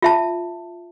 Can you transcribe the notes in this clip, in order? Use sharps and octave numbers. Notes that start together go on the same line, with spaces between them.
F4 E5 A5